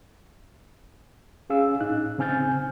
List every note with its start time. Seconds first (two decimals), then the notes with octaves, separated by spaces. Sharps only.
1.50 C#4 G#4 F5 E6
1.81 A2 D#4 F#6
2.18 C#3 C4 G#5 F6 G6 A6